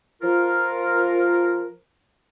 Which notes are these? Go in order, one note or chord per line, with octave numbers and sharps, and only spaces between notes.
F3 F4 A#4